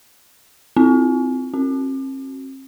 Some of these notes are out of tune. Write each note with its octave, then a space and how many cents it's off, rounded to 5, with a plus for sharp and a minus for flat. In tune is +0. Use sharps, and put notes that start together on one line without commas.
C4 -10 F4 +0
C4 +45 F#4 +0